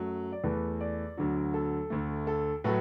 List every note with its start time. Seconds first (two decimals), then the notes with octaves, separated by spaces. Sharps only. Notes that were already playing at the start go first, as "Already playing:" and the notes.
Already playing: F#2 F#3 A3
0.32 D5
0.44 E2 E3 A3 B4
0.81 D5
1.17 D2 D3 F#3
1.54 A4
1.90 D2 D3 A3
2.27 A4
2.64 A2 F#3 A3 B4